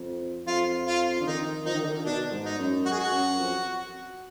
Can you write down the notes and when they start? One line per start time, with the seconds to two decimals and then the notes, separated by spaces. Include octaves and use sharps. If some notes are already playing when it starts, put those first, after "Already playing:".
Already playing: F2
0.46 F2 F4
0.87 F4
1.20 D3
1.27 D#3 D#4
1.66 F3 D#4
1.74 D#3
1.82 D3
1.90 D#3
2.05 B2 D4
2.32 G#2
2.46 D#4
2.58 F#2
2.85 F#4
2.92 G#4
2.99 F#4
3.11 F#2
3.39 F2